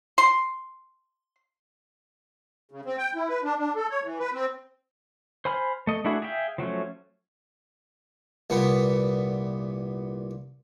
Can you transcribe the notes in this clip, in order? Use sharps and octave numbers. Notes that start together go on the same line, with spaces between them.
C6
C#3
C4
G5
E4
B4
D4
D4
A4
C#5
E3
B4
C4
C5 G#5 B5 F6
A3 D#5
A3 D4 E4 F#4 G#4
G#4 E5 F5 G5
F3 F#3 A3 C#4
C2 A#2 B3